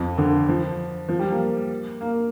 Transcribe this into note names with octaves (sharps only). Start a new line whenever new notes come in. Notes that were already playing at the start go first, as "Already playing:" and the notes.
Already playing: F2
D3
F3
F3
G3
A#3
A#3